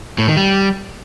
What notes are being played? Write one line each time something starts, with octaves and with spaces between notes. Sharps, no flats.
A2
D#3
G3